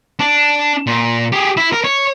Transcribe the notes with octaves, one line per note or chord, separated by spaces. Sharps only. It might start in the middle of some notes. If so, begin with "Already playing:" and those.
D4
A#2
G4 G#4
E4
A#4
C#5